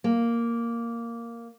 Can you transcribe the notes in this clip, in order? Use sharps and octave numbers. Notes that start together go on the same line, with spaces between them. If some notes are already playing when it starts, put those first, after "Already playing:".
A#3